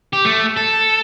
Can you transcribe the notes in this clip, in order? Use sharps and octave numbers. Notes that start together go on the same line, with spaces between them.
G4
A3
A4